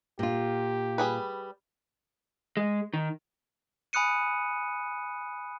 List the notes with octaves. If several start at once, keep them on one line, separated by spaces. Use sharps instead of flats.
A#2 F4 G4
G3 G#4 B4
G#3
D#3
G#5 B5 D#6 F#6 C#7 D#7